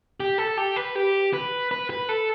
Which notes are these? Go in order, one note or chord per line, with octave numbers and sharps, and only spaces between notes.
G4
A4
G4
B4
G4
B4
B4
B4
A4